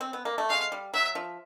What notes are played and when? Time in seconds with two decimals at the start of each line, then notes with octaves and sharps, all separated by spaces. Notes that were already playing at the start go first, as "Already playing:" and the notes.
0.01 C4
0.13 B3
0.25 A#3
0.38 A3
0.49 G#3 F5
0.72 G3
0.94 F#3 E5
1.15 F3